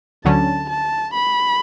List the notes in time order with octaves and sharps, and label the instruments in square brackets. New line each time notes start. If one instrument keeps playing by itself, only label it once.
[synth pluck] D2 D3 F#3 C#4 [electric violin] A5
[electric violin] A5
B5